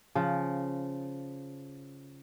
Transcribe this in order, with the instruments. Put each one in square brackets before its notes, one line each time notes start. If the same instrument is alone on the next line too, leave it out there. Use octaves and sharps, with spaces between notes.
[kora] C#3 F3